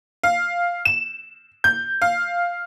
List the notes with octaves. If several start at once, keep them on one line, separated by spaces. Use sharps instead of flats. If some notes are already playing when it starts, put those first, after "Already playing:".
F5
E7
G6
F5